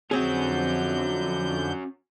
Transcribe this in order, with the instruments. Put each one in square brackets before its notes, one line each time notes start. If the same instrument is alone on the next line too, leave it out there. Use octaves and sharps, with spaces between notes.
[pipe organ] F2 D3 G6 [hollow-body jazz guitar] C4 G#4 [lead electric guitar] C#4 F#4